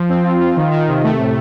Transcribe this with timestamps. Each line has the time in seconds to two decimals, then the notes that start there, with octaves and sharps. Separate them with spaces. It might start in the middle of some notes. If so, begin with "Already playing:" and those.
Already playing: F3
0.09 C4
0.24 F4
0.41 F4
0.56 D#3
0.71 D#3
0.88 C3
1.04 A3
1.19 A2